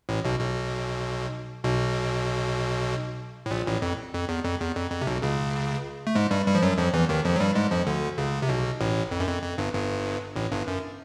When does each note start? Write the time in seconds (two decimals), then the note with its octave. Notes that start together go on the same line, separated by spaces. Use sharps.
0.09 A1 A2
0.24 B1 B2
0.40 B1 B2
1.64 B1 B2
3.46 A2
3.51 A#1 A#2
3.67 A1 A2
3.82 F2
4.14 F2
4.29 E2
4.44 F2
4.61 E2
4.76 F2
4.91 F2
5.01 C3
5.07 B1 B2
5.22 C#2 C#3
6.07 A3
6.15 G#2 G#3
6.31 G2 G3
6.47 G2 G3
6.55 F3
6.62 F#2 F#3
6.78 F2 F3
6.93 E2 E3
7.09 D#2 D#3
7.25 F2 F3
7.36 F#3
7.40 G2 G3
7.55 G#2 G#3
7.71 F2 F3
7.87 D2 D3
8.18 C#2 C#3
8.42 C3
8.49 B1 B2
8.81 A1 A2
9.11 F2
9.20 F#2
9.27 F2
9.43 F2
9.58 G1 G2
9.74 G1 G2
10.36 A1 A2
10.52 G1 G2
10.67 F#2